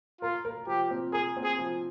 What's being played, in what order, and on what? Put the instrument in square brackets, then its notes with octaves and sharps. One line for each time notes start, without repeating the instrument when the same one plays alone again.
[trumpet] F4 [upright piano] A#4
[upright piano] A#4
[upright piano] F3 [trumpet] G4
[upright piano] C4
[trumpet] G#4 [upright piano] A#4
[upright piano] C4
[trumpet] G#4
[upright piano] F3